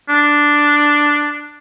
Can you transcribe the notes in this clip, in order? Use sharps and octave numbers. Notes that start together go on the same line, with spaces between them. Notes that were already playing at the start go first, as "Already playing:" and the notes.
D4